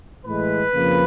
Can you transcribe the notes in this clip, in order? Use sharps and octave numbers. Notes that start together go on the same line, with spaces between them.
A2 E3 G#3 B4
F2 C#3 F3 A#3